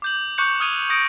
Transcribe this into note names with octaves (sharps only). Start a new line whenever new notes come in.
D6 G6 F#7
C#6 D6 F#6 G6 C#7 F7
D#6 F6 G#6 D#7 F7
D#6 G6 A#6 C#7 D7